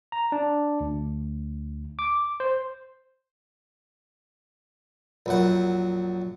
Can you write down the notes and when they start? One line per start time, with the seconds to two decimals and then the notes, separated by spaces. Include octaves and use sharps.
0.12 A#5
0.32 D4
0.81 D2
1.99 D6
2.40 C5
5.26 A#1 F#2 F#5